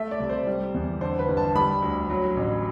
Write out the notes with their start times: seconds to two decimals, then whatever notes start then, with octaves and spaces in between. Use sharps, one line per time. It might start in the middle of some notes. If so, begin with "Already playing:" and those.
Already playing: A3 E5
0.11 D5
0.20 C2
0.29 C5
0.47 G3
0.74 E2
1.01 D3 C5
1.19 B4
1.28 G1
1.37 A5
1.55 G3 B5
1.82 D2
2.10 F#3
2.37 A1